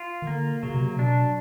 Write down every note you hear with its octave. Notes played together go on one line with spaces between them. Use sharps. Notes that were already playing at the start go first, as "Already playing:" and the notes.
Already playing: F4
D#3
D3 A#3
C#3 F#3
C3
C#3
C3
B2 D4